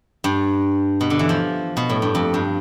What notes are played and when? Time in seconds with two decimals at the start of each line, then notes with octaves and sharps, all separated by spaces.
0.24 G2
1.01 B2
1.10 D3
1.19 E3
1.29 F3
1.77 B2
1.90 A2
2.02 G2
2.15 F2
2.34 G2